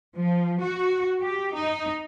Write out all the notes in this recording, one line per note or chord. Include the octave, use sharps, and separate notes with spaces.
F3
F#4
G4
D#4